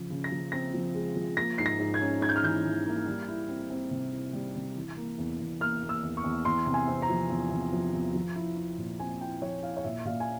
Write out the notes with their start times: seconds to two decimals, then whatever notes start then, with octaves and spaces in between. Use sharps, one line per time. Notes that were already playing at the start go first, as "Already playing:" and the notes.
Already playing: C#3 F3
0.10 C#3
0.24 A#6
0.31 F3
0.52 C4 A#6
0.74 F3
0.95 G#3
1.15 F3
1.37 A#3 A#6
1.58 G#2 C7
1.66 A#6
1.79 G#2
1.94 G#6
2.00 C#4
2.21 G#2 G#6
2.29 G6
2.36 F6
2.43 E3 G6
2.65 E3
2.86 A#3
3.06 G3
3.28 E4
3.48 C4
3.70 C4
3.91 C3
4.12 E4
4.33 G3
4.55 C3
4.75 E3
4.97 A#3
5.18 E2
5.39 E2
5.60 A#3 F6
5.82 A#3
5.89 E6
6.03 E2
6.17 C#6
6.24 E2
6.45 E2 C6
6.66 C3
6.74 G#5
6.87 C4
7.02 A#5
7.09 F3
7.30 E2
7.52 C3
7.72 F3
7.93 E2
8.14 F3
8.36 E4
8.57 E4
8.78 A#2
8.99 C4 G#5
9.21 E4 G5
9.42 F3 C#5
9.63 E4 F5
9.77 C#5
9.84 A#2 E5
10.05 A#2 F5
10.20 G#5